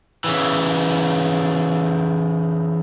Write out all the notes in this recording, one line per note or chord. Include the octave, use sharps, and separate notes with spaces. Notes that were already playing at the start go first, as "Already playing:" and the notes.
C#3 E3